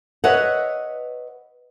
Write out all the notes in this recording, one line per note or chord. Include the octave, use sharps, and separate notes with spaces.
B4 C#5 D#5 E5 F#5